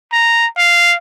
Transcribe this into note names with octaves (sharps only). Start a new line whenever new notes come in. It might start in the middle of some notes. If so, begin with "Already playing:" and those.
A#5
F5